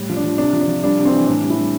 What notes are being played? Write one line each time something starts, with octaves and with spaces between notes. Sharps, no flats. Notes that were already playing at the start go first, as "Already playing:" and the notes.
Already playing: A2 G3
F3
D4
F3
C3 D4
F3
D4
F3
G3 D4
C3
C4
E3
A2 D4
G3
E4
G3